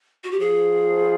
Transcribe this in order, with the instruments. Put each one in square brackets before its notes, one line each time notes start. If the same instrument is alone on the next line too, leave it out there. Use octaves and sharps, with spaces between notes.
[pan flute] F#4
G4
[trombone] F3 [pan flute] G#4